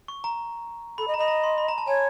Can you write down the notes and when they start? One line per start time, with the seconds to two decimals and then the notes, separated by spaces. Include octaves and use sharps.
0.08 C#6
0.24 A#5
0.98 A4 B5
1.08 D#5
1.14 A#5
1.18 D#5 B5
1.28 A#5
1.44 C6
1.58 B5
1.68 A#5
1.78 A5
1.87 C#5 G#5